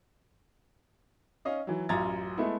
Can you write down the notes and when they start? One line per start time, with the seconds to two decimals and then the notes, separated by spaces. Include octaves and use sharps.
1.45 C#4 D#5 F5
1.67 E3 F#3
1.89 A1 F#2 F4 A#5 G#6 A6
2.38 G#3 A3 B3 E4